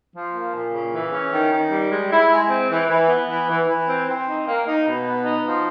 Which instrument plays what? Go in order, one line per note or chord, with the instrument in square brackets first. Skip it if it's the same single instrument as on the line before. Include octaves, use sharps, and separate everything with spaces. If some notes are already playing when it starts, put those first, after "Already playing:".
[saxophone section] F3
A#3
A#2
C#3
E3
C#4
D#3
D#3
G3
G#3
E4
G#3
C4
E3
E3
B3
E3
E3
E3
C4
C4
D#4
A#3
D#4
B2
B3
D#4
F3